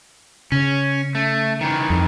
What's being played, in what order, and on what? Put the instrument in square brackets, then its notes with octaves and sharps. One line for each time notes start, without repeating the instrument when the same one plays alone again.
[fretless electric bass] C#3 [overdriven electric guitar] C#4
[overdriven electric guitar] A3
D#3 E3
[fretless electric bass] F2